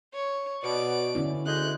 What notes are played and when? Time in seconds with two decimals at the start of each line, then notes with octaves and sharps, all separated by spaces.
0.14 C#5
0.63 B2 D5 D7
1.15 D3 C#4 E4
1.46 D2 G#3 F#6 G6